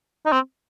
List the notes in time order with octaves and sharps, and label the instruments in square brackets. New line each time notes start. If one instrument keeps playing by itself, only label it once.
[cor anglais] D#4
C4